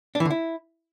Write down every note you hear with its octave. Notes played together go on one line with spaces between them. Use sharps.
D4
E3
D3
E4